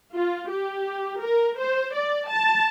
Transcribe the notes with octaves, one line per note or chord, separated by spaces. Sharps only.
F4
G4
A#4
C5
D5
A5